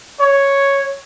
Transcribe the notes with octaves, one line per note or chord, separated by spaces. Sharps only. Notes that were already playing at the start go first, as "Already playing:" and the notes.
C#5